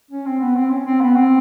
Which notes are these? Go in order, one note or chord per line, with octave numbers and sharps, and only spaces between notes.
C#4
C4
B3
C4
C#4
C4
B3
C4